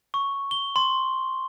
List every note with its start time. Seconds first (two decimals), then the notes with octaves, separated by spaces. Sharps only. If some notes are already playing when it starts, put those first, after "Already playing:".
0.14 C#6
0.51 G7
0.76 C6